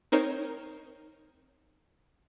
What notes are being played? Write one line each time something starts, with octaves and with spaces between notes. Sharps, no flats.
C4 D#4 A#4 C5 C#5